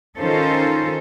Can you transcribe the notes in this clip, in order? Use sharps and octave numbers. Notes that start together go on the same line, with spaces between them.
D#3 C#4 D#4 F4 A4 C5